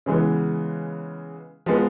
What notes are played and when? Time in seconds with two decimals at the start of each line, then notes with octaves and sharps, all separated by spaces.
0.06 C#3 E3 G#3 B3
1.66 F3 G#3 B3